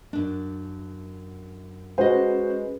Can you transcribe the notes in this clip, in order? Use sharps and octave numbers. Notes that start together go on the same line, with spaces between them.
F#2 D4
G#3 C#4 F#4 G#4 B4 C5 D#5